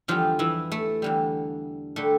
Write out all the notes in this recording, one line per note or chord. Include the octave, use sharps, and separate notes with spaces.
E2 D3 F3 G3 F4
E3 E4
A3
E2 D3 G3
D3 G3 A3